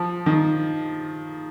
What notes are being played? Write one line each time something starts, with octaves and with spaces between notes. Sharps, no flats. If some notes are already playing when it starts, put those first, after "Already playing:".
Already playing: F3
D#3